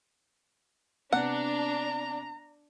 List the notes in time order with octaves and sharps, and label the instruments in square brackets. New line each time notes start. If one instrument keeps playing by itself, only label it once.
[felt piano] C3 B3 [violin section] D4 [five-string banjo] F#5 [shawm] A#5